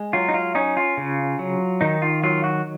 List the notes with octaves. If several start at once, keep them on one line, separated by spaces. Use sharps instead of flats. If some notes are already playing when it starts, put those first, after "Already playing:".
Already playing: G#3
F#3 F4
D#4
F4
C#4 D#4
F4
C#3
F#3
D#3 D#4
F4
F#3 F4
F#4